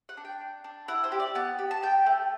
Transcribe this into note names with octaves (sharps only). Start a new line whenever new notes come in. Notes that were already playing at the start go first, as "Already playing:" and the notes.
F#5
D4
G5
D4
D4
E4 F#5
C5
G4
D5
B3 A5
G4
A5
G4 G5
A3